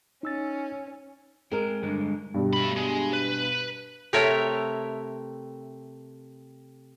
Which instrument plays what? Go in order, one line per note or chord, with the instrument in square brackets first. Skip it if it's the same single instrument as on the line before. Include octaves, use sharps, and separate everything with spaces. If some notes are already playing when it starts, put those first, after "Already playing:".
[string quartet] C#4 [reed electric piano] D#4 E6 A6
[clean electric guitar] G#3 C4 [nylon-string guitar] G#4 A#4
[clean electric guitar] G2 D3 G#3
[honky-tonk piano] G2 B2 G3
[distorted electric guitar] A3 B5
G#3
B4
[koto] C3 A3 A4 A#4 C#5 E5